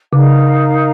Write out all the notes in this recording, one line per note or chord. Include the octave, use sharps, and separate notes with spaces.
C#3 D#4 A#4 F5